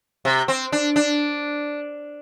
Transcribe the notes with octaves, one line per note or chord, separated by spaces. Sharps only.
C3
C4
D4
D4